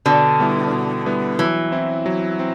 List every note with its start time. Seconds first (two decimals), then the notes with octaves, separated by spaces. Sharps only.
0.06 B2 D3
0.40 G3 B3 E4
0.72 B2
1.06 G3 B3 E4
1.39 E3 F#3
1.72 C4 E4
2.06 F#3
2.39 C4